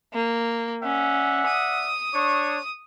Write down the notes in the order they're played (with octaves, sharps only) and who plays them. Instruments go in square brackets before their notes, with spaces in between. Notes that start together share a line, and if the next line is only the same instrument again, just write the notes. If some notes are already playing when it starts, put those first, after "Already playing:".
[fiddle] A#3
[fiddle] C#4 [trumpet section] D5 E5 F#5
[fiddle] D#6
[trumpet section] D4 C#5 C#6